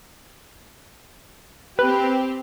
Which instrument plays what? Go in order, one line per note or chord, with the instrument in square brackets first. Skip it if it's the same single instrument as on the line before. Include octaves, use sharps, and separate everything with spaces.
[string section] C4 G4 [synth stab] B4